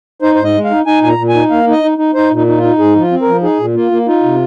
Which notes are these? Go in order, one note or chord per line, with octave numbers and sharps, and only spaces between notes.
D#4 C5
C5
G#2
D#5
G#3
F5
D#4
D#4 G#5
A#2 G#5
A#5
A#2
G#5
D#4
A#3 F5
D#4 D#5
D#4
D#4
D#4 C5
A#2
D#4
D#4
F4
D#4
G#2 G#4
F3 F4
C4
A#4
F3
D#4 G#4
A#2
A#3 F4
A#3
D#4 F4
C3